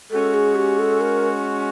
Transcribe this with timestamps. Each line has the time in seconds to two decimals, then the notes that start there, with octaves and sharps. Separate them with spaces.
0.11 G#3 C#4 F#4 A4
0.34 G#4
0.55 G4
0.79 A4
1.01 A#4